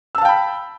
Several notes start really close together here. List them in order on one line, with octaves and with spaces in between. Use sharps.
E6 A5 F5 G5 B5